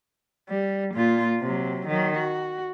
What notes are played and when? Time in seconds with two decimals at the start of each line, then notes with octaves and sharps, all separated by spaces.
0.49 G3
0.94 A#2 F4
1.40 C3 F#3
1.87 D#3 F#3
2.16 F#4